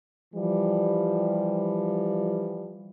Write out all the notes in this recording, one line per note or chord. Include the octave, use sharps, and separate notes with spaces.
E3 F3 G3